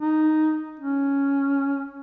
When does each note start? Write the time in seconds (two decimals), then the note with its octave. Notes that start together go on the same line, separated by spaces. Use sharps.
0.02 D#4
0.80 C#4